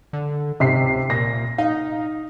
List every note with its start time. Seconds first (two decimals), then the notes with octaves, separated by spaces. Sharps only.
0.13 D3
0.60 G#2 C3 B6 C7
0.84 C#2
1.10 A#2 A#6
1.58 D#4 F5